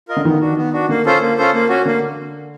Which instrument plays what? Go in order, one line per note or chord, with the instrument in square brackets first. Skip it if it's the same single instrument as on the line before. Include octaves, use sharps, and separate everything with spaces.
[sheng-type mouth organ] F4 A#4 D#5
[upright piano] D3
[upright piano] D#3 [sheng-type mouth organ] B3
[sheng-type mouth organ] D4 F#4
B3
D4 F#4
[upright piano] D3 [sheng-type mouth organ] A#3
[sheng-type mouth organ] C#4 F4 A4 C5
A#3
C#4 F4 A4 C5
A#3
C#4 F#4
[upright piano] D3 [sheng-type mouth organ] A#3